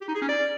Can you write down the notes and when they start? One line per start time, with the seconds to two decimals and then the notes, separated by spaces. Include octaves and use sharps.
0.02 G4
0.08 D#4
0.15 G#4
0.22 C#4
0.29 D5